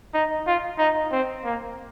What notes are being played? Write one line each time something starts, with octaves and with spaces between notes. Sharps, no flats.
D#4
F4
D#4
C4
A#3